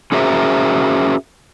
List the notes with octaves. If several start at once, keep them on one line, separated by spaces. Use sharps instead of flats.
C#4 F#4 G#4 A#4 C5 E5